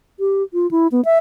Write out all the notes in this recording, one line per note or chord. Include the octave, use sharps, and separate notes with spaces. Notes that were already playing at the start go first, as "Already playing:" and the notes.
G4
F4
E4
B3
E5